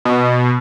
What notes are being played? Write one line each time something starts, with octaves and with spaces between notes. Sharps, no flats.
B2